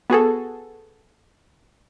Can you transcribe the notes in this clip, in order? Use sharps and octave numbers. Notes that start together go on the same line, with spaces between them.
B3 F#4 G#4 A4